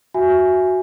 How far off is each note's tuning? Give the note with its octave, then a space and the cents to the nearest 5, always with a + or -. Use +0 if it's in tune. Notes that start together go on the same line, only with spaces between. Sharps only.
F#4 +0 E5 +10 G#5 +0